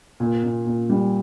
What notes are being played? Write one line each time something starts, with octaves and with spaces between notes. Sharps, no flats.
A#2
A#2
A#2
G3